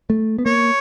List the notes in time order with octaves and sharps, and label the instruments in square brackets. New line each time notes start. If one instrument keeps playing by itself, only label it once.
[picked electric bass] A3
B3
[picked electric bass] A#3 [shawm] C#5